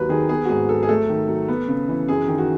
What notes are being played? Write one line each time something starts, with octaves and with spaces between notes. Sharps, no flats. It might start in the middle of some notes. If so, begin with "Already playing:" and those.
Already playing: D#2 F#3 B4
D#3 G#4
B3 G#4
F#4
G#2 G#4
F#3 A4
G#4
A3 A4
D#3
F#3
B3
C#3
E3
F#2 G#4
D#3
F#4